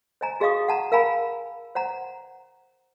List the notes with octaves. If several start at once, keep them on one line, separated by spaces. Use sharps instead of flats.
C5 D#5 G#5 A#5
F#4 G#4 D#5 F5 C#6 D#6
F#5 A5 A#5
A#4 F5 G#5 A#5 B5
C5 F#5 A#5